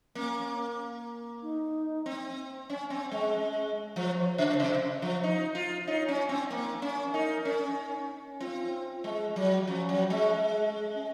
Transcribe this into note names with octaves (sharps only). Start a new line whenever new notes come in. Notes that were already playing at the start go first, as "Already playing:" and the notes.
A#3 C#4
D#4
C4
C#4
C4
G#3
C#4
F3 C5
C#5
C5
C#5
C5
C#3
C3 C5
F3
D#4
F4
D#4 C#5
C#4
C4
A#3
C#4
D#4 A#4
C#4
C4 F4
G#3
F#3
F3 C#4
F#3
G#3
C#4